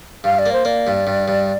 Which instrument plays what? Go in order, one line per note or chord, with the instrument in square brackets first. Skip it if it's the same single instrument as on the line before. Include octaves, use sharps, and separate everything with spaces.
[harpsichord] G2 [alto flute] F5
[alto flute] D5
[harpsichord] A#3
[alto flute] C5
[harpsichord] A#3 [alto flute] D5
[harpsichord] G2
G2
G2